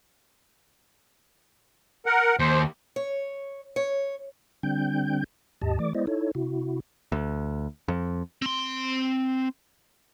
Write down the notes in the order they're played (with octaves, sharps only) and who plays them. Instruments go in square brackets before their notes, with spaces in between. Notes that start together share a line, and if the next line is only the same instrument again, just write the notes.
[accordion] A#4 F#5
[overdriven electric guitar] D#2 [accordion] C5
[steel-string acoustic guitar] C#5
C#5
[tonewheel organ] D3 G3 C4 D4 G5 G6
D#2 G#2 G4 D#5 A5
E3 A3 D5 D6
G#3 B3 E4 C5 D5 D#5
D#4 E4 A4 C#5
C3 E4 F#4
[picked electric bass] D2
F2
[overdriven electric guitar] C4 C6